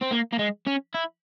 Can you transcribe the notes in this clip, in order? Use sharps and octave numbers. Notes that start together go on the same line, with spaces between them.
C4
A#3
A#3
G#3
C#4
E4